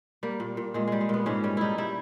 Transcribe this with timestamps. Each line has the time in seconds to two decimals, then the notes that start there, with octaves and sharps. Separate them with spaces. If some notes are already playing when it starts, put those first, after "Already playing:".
0.23 G3 A#3
0.40 A#2
0.57 A#2
0.74 A#2 G#3
0.87 G3 G#3
1.01 G#3
1.09 A#2 B3
1.26 G#2 C#4
1.44 G3 C#4
1.57 G3 D#4 E4
1.78 G3 E4